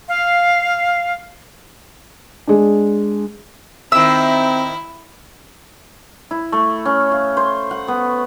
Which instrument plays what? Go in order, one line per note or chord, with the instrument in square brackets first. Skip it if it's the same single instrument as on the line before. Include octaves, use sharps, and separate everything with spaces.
[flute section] F5
[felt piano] G#3 D4
[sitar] D#3 E5 [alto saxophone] C4 [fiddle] E4 [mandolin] E6
[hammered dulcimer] E4
A3
C#4
F5
C5
F#5
B3